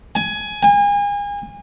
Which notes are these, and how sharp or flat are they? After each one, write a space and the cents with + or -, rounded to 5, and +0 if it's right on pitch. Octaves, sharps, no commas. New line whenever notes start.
G#5 +15
G#5 -35